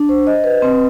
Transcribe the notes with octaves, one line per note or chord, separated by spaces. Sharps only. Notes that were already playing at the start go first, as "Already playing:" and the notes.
Already playing: D4
C5
D#5
B4
C4